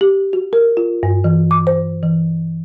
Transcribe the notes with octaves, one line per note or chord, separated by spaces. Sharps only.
G4
F#4
A#4
F4
G2
E3
D6
C5
E3